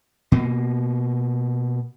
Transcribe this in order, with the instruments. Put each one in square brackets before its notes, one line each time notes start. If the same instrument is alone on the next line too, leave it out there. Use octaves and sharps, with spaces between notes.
[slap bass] B2 A#3